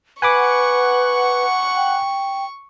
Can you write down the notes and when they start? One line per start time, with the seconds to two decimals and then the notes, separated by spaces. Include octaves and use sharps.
0.22 B4 F#5 G#5 B5 C#6 D6
1.77 G5